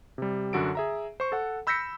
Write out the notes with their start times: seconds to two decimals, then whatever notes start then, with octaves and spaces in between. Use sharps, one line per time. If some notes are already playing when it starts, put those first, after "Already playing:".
0.18 C3 G3
0.53 F#2 D3 F#4 A4 D7
0.75 G#4 E5 A#5
1.20 C5 C#6
1.32 A4 F#5
1.67 B5 E6 G6 A#6 B6 C#7